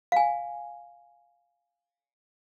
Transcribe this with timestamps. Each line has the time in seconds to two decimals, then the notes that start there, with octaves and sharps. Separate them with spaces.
0.12 F5 G#5